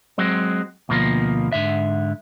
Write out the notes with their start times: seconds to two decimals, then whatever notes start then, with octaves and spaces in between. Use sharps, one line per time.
0.18 F#3 G#3 C4
0.89 D2 B2 F3 A#3
1.52 G#2 D3 E5